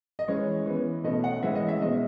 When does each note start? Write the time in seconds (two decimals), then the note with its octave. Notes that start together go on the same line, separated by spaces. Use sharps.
0.19 D#5
0.28 E3 G#3 C#4 C#5
0.66 E3 B3
1.04 B2 A3 C#4 D#5
1.24 F#5
1.43 E3 G#3 C#4 E5
1.55 D#5
1.69 E5
1.81 B2 G#3 C#4 D#5